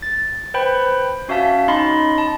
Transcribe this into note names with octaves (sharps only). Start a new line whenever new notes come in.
A6
B4 C5 G5 B5
C#4 F#4 E5 F5 A5 B6
C#4 D#4 D#5 B5 C6
A5